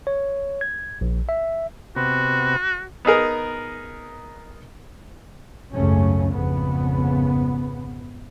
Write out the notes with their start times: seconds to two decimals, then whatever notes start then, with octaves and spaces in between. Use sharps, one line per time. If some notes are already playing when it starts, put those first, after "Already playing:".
0.07 C#5
0.61 G#6
1.01 A#1
1.29 E5
1.96 C3 B3 F#4
3.05 B3 D#4 G#4 A#4
5.73 G#1 C#2 F#2 C#3 A3 C#4
6.32 G#1 F2 C#3 B3